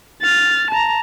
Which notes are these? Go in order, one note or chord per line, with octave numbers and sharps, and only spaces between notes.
F6 A6
A5 A#5